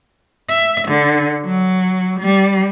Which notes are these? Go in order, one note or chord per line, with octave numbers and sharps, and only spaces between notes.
E5
D3
F#3
G3